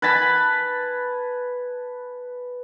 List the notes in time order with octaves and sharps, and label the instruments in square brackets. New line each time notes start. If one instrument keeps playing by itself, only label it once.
[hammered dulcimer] B4 G#5 A5 B5